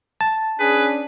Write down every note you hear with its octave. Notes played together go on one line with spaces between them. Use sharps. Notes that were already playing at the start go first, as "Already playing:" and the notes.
A5
C#4 D4 G#4 B4